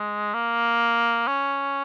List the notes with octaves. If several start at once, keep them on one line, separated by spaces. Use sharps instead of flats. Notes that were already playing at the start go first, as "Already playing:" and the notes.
Already playing: G#3
A#3
C#4